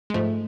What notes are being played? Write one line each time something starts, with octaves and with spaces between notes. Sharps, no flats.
G#3
G#2 F3 A3